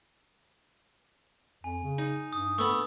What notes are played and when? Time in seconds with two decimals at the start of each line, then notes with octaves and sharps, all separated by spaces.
1.64 F2 G#5
1.84 C#3
1.98 D#4
2.33 G2 D#6
2.58 A3 B3 E6